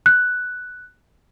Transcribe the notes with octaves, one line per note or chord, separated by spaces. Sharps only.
F#6